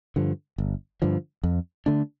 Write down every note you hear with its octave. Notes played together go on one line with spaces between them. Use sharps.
G2 D3 F3
G1
G2 D3 F3
F2
D3 A3 D4